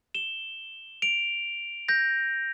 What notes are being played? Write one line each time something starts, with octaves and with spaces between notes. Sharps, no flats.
E7 G7
D7 F7
G6 A#6